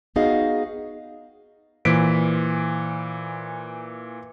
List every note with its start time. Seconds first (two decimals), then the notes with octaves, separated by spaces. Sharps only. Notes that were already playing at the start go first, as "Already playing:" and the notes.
0.16 B3 D#4 F#4 G#4 D#5 F5
1.85 A#2 E3 C5 B6 D7